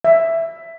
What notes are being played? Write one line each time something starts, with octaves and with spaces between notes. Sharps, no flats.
E5